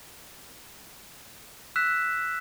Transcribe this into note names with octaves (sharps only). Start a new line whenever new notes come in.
E6 F#6 B6 E7